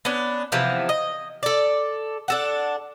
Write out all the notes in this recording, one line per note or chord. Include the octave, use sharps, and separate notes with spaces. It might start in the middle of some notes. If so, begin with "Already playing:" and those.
B3 C#4 D4
C3 E3 F3 B3
D#5
A4 D5
D4 A4 F#5